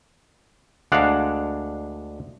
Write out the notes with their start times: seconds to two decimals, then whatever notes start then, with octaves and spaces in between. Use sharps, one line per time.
0.92 D2 G#3 D4 F5 F#5